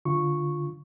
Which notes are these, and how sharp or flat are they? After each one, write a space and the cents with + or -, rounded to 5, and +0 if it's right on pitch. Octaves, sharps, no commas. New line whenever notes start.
D3 +0 F4 +0 C#6 -5